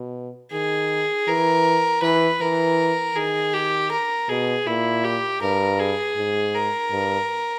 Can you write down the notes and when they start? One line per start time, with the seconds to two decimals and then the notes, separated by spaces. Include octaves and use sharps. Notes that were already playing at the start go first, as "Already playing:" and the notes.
Already playing: B2
0.52 D#3 G#4
1.27 E3 A#4
2.02 E3 B4
2.41 E3 A#4
3.15 D#3 G#4
3.53 G4
3.91 A#4
4.29 B2 G#4
4.67 A#2 E4
5.04 G4
5.42 G2 A#4
5.80 G#4
6.17 G#2
6.55 A#4
6.92 G2